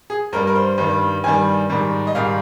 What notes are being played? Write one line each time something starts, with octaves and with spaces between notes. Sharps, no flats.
G#4
G2 G3 A#4
A#4
C5
G2 D#3 G3
G2 D#3 G3 G#5
G#2 D#3 G3
D#5
G#2 D#3 G3 F5